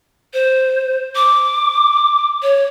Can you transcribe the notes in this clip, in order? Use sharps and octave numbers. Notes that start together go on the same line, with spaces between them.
C5
D6
C#5